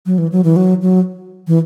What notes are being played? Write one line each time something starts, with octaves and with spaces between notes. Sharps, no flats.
F#3
E3
F#3
E3
F#3
F#3
E3